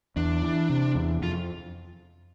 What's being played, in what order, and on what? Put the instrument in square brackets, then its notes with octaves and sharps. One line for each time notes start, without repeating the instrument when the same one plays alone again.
[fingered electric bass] E2 [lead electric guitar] D4
[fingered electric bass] E3
C3
E2
[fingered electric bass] F2 [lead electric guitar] F4